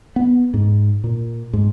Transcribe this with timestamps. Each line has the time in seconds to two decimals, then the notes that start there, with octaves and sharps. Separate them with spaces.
0.16 B3
0.54 G#2
1.04 A#2
1.53 G#2